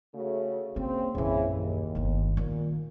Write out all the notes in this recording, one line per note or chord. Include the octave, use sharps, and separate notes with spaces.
C#3 A3 F#4
C#3 A#3 C4
A#1 F#2 C#3 E3
D#2
G1 D#3
A#2 D#3